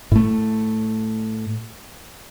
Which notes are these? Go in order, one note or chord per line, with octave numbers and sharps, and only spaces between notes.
A2 A3